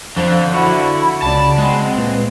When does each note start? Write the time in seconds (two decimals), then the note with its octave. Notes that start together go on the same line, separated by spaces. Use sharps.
0.17 F2 D3 D4 C5 F5
0.54 E4 F#4 B5
1.22 C#2 C#3 D5 A5 B5
1.58 G#3 C4 F#5
1.97 A#2 B4